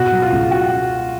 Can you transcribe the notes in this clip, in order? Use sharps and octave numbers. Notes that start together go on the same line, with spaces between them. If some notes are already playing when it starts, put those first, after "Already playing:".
Already playing: B2 F#4
F#3
F4
C#2
F#4